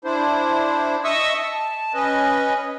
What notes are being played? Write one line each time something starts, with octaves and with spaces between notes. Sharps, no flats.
D4 E4 C5
D#5 E5 C#6 D#6 E6
A5
C#4 B4 D#5